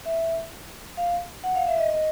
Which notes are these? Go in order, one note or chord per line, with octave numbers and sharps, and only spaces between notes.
E5
F5
F#5
F5
E5
D#5
D#5